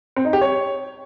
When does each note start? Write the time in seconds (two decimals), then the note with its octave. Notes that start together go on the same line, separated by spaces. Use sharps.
0.16 C4
0.25 D#4
0.33 G4
0.41 C#5